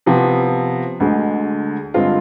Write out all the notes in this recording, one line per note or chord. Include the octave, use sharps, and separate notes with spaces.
C3 F3 B3
D2 D3 G#3
G2 D3 G#3 C4 F4